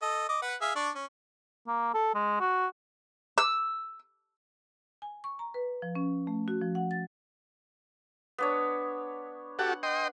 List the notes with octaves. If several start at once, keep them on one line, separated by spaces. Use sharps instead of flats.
A4 D#5
D#5 D6
B4 F#5
G#4 E5 F5
D4 D5 C#6
C#4
A#3
A4
G#3
F#4
E6
G#5
C#6
A#5
B4
F3
C#4
A3
F#4
F3
F#5
A6
B3 D4 C#5
F#4 G4 A4 F#5
D#5 G5 C6